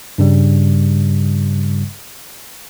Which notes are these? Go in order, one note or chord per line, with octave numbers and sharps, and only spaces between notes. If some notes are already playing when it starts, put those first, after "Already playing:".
G2 C#3 G3